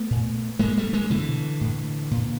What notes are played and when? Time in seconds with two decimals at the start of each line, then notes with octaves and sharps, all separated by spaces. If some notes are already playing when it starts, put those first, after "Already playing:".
Already playing: A3 B3
0.11 A#2
0.59 A2 G#3 A#3
0.77 G3 A3
0.93 G#3 A#3
1.10 B2 D3 E3
1.61 A2
2.11 A#2